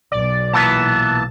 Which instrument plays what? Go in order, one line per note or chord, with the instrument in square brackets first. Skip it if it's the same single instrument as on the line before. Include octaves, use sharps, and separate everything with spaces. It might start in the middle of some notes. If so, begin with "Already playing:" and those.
[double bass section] B1 [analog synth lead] D5
[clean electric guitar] A#2 E3 B3 [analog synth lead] A5